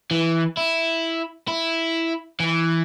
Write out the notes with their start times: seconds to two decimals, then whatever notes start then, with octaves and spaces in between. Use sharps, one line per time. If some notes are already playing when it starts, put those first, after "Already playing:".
0.11 E3
0.57 E4
1.48 E4
2.40 E3